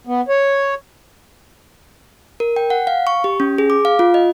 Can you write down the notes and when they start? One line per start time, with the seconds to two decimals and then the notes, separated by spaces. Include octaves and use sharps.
0.07 B3
0.29 C#5
2.40 A#4
2.56 G5
2.70 F#5
2.87 F5
3.07 C#6
3.24 G4
3.40 C#4
3.58 G#4
3.70 D6
3.85 F5
3.99 F4
4.14 D#5